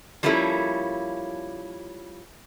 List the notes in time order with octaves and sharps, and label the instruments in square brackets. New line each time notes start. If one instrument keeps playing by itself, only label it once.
[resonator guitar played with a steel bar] F3 G3 A#3 C#4 E4 A4